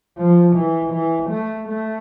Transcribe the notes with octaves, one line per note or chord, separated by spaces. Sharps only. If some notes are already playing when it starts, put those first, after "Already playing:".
F3
E3
E3
A3
A3